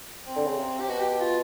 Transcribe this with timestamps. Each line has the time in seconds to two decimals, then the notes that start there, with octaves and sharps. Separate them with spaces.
0.25 C4
0.36 D3
0.46 C#3
0.57 C3
0.80 G4
0.89 B2 F#4
0.99 G4
1.09 G4
1.20 F4